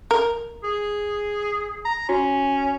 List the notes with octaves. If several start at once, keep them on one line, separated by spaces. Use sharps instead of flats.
A#4
G#4
A#5
C#4 F#4